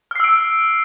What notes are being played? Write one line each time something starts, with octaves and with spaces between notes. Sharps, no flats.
E6 F6 C7 D7